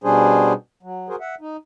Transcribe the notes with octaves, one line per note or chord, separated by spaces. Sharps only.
B2 G3 C#4 D4 G#4 C5
F#3
F#4 G#4 A#4 C5
E5 F#5
D#4